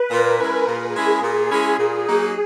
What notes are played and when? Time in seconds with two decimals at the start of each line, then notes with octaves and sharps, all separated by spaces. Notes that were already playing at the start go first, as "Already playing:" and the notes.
Already playing: B4
0.10 A#2 A#4
0.39 G#3 C#4 E4
0.66 A#2 G#4
0.94 G#3 C#4 E4
1.21 A#2
1.50 G#3 C#4 E4
1.77 A#2
2.05 F#3 A#3 D#4